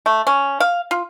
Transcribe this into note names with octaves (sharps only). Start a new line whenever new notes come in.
A3
C#4
F5
F4